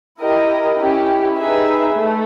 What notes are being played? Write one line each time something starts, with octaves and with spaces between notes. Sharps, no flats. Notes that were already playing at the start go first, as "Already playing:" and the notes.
E4 G4 A#4 D#5
C#4 E4 G4
D#4 G#4 B4 E5
A3